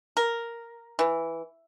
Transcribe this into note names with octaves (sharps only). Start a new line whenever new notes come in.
A#4
E3